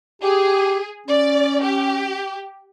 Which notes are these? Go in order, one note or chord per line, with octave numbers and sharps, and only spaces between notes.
G4 G#4
C#4 D5
G4